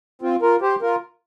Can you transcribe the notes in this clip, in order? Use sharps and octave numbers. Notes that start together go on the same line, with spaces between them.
C4 F4
F4 A#4
G4 C5
F4 A#4